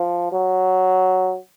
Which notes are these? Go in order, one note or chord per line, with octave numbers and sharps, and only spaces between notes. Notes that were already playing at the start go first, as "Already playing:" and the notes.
Already playing: F3
F#3